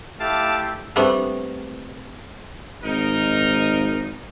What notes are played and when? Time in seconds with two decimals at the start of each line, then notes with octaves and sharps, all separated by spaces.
0.20 A3 E4 G4 F5 A5 D6
0.96 G3 A3 B3 C4 D4
2.84 G#1 D#4 A#4 D#5